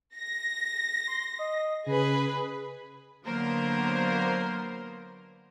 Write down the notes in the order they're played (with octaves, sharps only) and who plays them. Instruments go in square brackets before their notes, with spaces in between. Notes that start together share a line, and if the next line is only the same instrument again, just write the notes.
[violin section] A#6
[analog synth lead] C6
D#5
[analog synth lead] C#3 [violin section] G#4 B4
[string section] D3 F#3 A#3 B3 A#4 C5